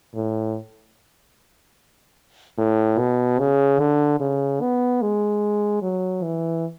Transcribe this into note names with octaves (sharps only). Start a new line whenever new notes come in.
A2
A2
B2
C#3
D3
C#3
B3
G#3
F#3
E3